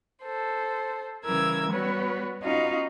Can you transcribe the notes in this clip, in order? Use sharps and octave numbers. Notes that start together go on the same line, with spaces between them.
A4 C5
C#3 E3 G3 A#4 E6 G#6
G3 B3 F#4 B4 C#5
B3 C#4 D#4 F4 F#4 F5